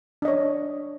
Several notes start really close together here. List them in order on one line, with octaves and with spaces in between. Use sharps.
D4 D#5 C#5